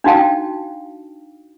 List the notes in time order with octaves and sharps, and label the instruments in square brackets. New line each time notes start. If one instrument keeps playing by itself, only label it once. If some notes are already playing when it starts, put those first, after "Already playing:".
[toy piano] D4 D#4 F#4 F5 G5 A5